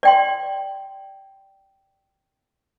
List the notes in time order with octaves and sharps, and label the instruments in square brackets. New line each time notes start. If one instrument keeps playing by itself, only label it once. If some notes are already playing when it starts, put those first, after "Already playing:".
[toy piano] D5 G5 C6